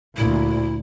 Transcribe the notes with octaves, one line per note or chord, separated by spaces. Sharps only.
D2 A#2 E4